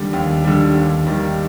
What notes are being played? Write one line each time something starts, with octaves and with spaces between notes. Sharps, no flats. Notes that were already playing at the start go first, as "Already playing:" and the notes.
Already playing: D#2 D3 G3
D#2
D3 G3
D#2
D#3 G3